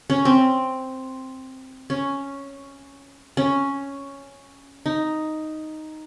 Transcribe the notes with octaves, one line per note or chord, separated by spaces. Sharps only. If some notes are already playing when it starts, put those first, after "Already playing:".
C#4
C4
C#4
C#4
D#4